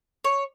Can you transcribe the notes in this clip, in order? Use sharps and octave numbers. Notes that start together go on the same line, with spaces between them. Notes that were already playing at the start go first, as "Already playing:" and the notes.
C#5